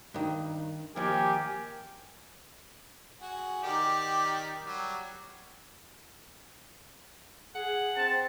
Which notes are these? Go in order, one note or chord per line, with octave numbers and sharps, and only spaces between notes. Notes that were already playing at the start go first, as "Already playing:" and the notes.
G2 D#3
D#2 F3 G4 A#4 G#5
F#4 G#4
D#3 G4 D5
F#3 G3
G#4 F#5
C4 A5